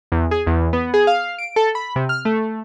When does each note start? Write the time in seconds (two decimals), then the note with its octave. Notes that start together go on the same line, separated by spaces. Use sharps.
0.12 E2
0.31 G#4
0.47 E2
0.73 B3
0.94 G#4
1.07 F5
1.38 D7
1.56 A4
1.75 B5
1.96 C3
2.09 F6
2.25 A3